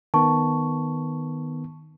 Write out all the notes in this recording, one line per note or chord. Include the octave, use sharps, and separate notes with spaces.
D#3 B3 A5 C#6